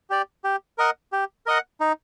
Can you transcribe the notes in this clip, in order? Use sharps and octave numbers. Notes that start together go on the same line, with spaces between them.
G4 D5
G4
A#4 D#5 F#5
G4
A#4 D#5 F#5
D#4